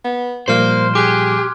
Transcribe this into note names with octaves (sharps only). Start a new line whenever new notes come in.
B3
A#2 F3 G3 A#3 C5 C6 F6
G4 G#4 D6 F#6 G#6